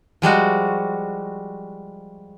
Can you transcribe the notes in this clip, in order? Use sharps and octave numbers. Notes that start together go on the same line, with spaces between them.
F3 G3 G#3 F#4